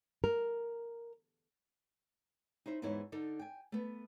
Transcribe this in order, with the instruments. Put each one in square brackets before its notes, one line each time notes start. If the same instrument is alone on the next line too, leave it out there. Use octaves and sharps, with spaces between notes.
[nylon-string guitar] A#4
D#4 E4 C5 E5
E2 G#2 B3 D#4 E4 C#5
D3 D#4 A4
G5 G#5
A3 B3